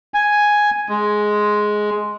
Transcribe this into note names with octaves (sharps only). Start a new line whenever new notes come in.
G#5
G#3